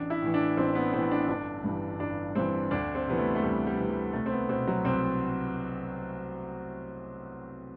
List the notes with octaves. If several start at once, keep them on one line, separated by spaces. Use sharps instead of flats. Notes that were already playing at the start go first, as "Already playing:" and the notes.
Already playing: A1 D4
E4
A2 E3
D4
A1 C4
B3
A2 E3 C4
D4
G1 D4
G2 E3
G1 D4
G2 E3 C4
D2 D4
C4
C3 E3 B3
A3
A3
D2 G3
G3
C3 E3
G3
C2 A3
C4
B3
B2 C4
F#3
C2 C4